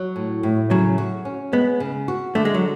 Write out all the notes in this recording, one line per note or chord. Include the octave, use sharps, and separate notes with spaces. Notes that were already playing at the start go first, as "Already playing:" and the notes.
Already playing: F#3
A2
A2
C#3 F#3
F#4
C#4
G#3 B3
C#3
F#4
D3 A3
G#3
F#3